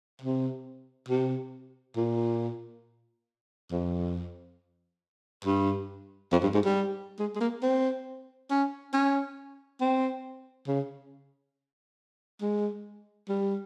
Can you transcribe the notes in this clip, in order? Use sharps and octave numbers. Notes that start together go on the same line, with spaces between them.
C3
C3
A#2
F2
G2
F2
G2
G#2
G3
G#3
G#3
A#3
C4
C#4
C#4
C4
C#3
G#3
G3